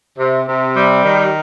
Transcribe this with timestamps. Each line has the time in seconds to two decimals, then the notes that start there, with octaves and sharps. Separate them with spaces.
0.19 C3
0.47 C3
0.76 G3
1.04 D#3